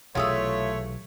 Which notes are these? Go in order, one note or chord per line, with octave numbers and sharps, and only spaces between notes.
B1 C3 E3 A3 F4 G#4 C#5 E5